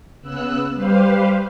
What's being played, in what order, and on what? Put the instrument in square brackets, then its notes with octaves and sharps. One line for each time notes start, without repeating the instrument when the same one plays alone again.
[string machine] C#3 B3 E6 F#6
G3 G4 B4 C5 F5